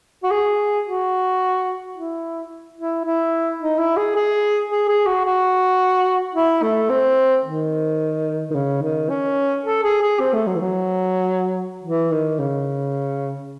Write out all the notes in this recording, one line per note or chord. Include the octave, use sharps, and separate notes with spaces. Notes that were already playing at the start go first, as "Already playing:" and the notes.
F#4
G#4
F#4
E4
E4
E4
D#4
E4
G#4
G#4
G#4
G#4
F#4
F#4
E4
A3
C4
D#3
D#3
C#3
D#3
C#4
A4
G#4
G#4
C4
A3
F#3
E3
F#3
E3
D#3
C#3